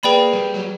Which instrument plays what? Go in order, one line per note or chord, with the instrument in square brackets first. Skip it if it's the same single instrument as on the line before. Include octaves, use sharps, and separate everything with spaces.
[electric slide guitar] A#3 [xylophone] G#4 B4 D5 G5 B5
[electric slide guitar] G3
F#3